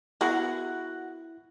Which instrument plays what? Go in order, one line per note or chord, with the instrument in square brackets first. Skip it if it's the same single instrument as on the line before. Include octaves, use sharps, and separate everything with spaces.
[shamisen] B3 G#4 A#4 [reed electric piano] E4 [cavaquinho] F#4 F#5